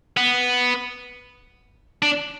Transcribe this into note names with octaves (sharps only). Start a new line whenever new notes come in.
B3
D4